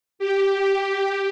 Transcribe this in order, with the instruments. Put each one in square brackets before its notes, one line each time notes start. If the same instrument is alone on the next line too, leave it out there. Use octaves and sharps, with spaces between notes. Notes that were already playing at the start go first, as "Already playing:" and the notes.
[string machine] G4